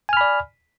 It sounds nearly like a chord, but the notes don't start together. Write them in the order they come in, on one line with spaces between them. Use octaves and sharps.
G#5 F6 B5 D5